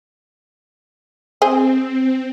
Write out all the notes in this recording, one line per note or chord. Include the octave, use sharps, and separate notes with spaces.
C4 G#4 C5